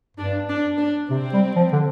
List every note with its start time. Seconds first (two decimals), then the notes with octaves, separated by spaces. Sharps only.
0.17 G2 D4
0.49 D4
0.78 D4
1.10 C3 C4
1.33 G3
1.56 F3
1.72 D3